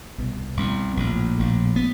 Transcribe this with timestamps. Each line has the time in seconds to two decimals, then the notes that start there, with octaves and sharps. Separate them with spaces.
0.18 C2 B2
0.57 C2 B2
0.97 A#1 A2
1.37 A#1 A2
1.76 B3